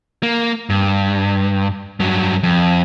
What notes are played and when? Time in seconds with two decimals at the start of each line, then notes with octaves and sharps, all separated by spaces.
0.23 A#3
0.70 G2
2.00 G2 F#3
2.43 F2